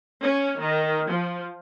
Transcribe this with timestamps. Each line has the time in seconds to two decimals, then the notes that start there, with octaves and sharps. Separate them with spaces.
0.21 C#4
0.58 D#3
1.08 F3